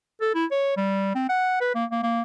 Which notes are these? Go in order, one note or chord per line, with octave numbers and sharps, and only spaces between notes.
A4
E4
C#5
G3
C4
F#5
B4
A#3
A#3
A#3